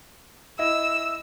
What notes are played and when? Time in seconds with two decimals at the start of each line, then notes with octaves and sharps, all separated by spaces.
0.59 E4 D#5 E6